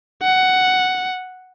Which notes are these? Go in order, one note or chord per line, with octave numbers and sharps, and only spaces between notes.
F#5